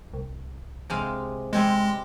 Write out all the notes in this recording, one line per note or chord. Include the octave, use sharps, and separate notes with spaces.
C2
C3 G#3 F5
G3 G#3 C4 G#5